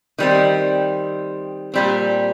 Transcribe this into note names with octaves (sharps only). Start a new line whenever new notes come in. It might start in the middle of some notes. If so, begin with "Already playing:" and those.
D#3 G3 C4
A#2 G3 C4